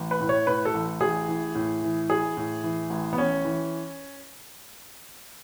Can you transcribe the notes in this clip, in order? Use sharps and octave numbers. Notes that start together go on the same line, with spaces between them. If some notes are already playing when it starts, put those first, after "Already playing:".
Already playing: A1
B4
A2
C#5
A2 B4
A4
A1
A1 G#4
E3
A2
E3
E3 G#4
A2
E3
A1
B3
A1 C#4
E3